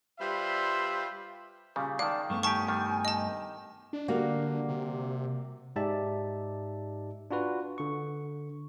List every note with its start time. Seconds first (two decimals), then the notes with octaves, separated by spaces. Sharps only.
0.19 G3 F4 B4 C5 D5 E5
1.76 A#2 C#3 G3
1.99 D#3 G#3 D5 F5 A5
2.30 G2 A3 B3 C#6
2.43 D#3 G4 G#5 A5 C#6
2.68 D#3 G3
3.05 D#5 A5
3.93 D4
4.08 D3 G3 A#3 F#4
4.69 C3
5.76 G#2 D#4 G4 D5 E5 A5
7.31 D4 F4 F#4 B4
7.78 D3 C#6